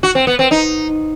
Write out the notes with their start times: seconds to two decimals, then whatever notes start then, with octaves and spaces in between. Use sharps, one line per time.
0.03 F#4
0.15 C4
0.27 B3
0.39 C4
0.51 D#4